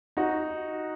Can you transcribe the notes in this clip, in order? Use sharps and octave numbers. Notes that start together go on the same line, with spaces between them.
D#4 F#4